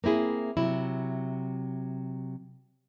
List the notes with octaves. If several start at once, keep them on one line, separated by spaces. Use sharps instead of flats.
A#3 C4 E4 G#4
C3 F#3 E4